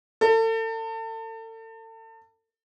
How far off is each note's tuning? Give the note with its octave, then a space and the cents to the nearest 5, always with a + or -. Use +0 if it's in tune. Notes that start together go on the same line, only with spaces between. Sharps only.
A4 +35